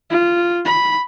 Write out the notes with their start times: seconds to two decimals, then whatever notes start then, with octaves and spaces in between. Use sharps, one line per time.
0.10 F4
0.65 B5